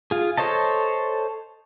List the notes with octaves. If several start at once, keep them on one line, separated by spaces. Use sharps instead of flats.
F4 G#4
A4 C5 C#5 D#5 A5